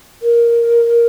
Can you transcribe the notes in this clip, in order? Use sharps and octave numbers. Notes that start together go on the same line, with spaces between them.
A#4